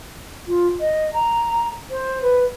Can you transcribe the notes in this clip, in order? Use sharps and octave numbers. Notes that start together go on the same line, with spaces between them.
F4
D#5
A#5
C5
B4